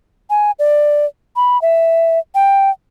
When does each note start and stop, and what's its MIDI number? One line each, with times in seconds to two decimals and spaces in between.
0.30 0.51 80
0.59 1.05 74
1.36 1.60 83
1.62 2.19 76
2.35 2.70 79